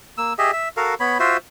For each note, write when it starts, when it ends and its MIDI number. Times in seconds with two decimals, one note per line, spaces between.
0.18 0.33 58
0.18 0.33 88
0.38 0.51 67
0.38 0.51 68
0.38 0.51 75
0.38 0.51 76
0.53 0.68 76
0.77 0.95 66
0.77 0.95 69
0.77 0.95 70
0.77 0.95 77
1.00 1.18 59
1.00 1.18 73
1.00 1.18 83
1.20 1.37 65
1.20 1.37 66
1.20 1.37 72
1.20 1.37 76